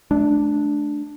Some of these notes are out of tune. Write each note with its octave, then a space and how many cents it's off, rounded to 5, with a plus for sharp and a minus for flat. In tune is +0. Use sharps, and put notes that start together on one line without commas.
A3 -40 D4 +0